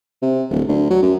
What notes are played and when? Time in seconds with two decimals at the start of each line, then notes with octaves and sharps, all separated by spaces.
0.22 C3
0.50 D1
0.68 D2
0.90 F#3
1.02 F#2